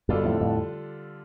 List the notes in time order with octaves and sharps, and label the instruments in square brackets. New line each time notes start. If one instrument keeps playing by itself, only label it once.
[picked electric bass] G2 B2 [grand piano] D3 G3 D4 F4 A4
[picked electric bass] F2 A2
F2 A2